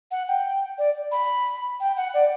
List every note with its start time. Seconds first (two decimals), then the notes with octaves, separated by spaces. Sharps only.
0.11 F#5
0.28 G5
0.78 D5
1.12 B5
1.80 G5
1.97 F#5
2.14 D5